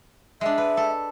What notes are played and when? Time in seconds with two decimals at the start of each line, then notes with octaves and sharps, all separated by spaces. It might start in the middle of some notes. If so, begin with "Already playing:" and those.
0.41 G#3 D4 E5
0.58 B4
0.77 A4